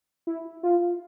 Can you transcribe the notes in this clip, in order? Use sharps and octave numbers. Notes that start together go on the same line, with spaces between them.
E4
F4